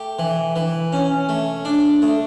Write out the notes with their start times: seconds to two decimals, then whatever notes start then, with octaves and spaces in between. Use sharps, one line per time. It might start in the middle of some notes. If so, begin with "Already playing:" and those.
Already playing: A3 G4
0.19 E3
0.56 E3
0.92 C#4
1.29 A3
1.65 D4
2.02 A3